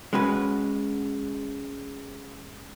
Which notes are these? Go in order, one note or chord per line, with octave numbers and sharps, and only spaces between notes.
G#3 C#4 F#4 B4